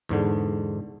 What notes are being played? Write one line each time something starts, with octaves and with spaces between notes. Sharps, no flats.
E2 G#2 D3